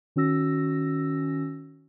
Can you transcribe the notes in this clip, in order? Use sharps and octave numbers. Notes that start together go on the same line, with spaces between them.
D#3 C#4 F#4 E6 A#6